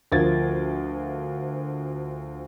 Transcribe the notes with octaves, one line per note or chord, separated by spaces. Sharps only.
D2 F3 A#4 G#6 A6